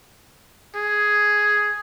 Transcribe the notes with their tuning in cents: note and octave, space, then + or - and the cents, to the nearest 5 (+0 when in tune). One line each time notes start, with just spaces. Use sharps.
G#4 +5